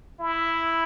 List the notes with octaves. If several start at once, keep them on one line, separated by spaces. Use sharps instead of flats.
E4